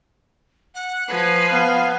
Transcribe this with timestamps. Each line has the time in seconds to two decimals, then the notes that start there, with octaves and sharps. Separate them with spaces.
0.75 F#5
1.08 F3 B4 G#5
1.51 B3 F5